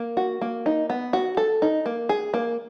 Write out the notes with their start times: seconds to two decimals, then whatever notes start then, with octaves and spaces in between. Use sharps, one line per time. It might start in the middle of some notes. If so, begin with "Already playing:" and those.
Already playing: A#3
0.17 F#4
0.41 A#3
0.66 D#4
0.90 B3
1.13 F#4
1.37 A4
1.62 D#4
1.86 A#3
2.09 G#4
2.34 A#3